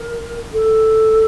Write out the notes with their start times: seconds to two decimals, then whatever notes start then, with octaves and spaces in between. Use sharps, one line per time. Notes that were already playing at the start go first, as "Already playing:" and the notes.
Already playing: A#4
0.53 A4